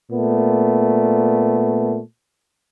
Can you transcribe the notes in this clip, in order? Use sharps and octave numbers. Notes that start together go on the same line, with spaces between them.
A#2 A3 B3